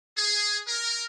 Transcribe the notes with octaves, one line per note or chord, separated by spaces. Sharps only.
G#4
A#4